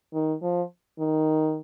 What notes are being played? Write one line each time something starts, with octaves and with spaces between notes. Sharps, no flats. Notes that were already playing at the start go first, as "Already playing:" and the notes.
D#3
F3
D#3